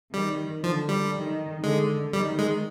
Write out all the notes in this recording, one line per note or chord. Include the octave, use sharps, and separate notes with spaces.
D#3 G3
D3 F3
G3
D#3
D3 G#3
D#3 G3
G#3